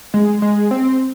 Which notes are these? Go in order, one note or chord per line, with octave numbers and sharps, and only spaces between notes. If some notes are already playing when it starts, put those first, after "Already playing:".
G#3
G#3
C4